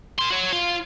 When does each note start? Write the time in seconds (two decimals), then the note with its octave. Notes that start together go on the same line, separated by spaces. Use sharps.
0.18 A#4 C6
0.30 F#4 C#5
0.53 F4